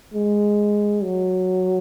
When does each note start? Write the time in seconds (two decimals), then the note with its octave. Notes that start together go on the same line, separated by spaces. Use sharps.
0.14 G#3
1.03 F#3